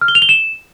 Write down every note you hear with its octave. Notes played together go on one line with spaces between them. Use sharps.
F6
G7
F7
G7
E7